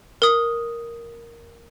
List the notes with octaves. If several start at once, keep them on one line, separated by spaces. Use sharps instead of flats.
A#4 D#6